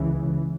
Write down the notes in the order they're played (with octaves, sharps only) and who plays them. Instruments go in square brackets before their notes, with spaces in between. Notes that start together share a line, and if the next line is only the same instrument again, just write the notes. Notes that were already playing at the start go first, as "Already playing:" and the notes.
Already playing: [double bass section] C#2 C#3 E3